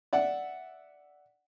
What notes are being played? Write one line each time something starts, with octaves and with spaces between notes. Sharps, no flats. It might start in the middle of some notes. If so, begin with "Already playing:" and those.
D5 E5 F#5